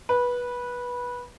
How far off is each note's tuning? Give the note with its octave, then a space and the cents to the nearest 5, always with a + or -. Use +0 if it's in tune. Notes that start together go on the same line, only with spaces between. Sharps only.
B4 -15